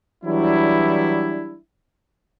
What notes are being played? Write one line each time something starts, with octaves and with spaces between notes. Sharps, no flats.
E3 F#3 G3 D4 E4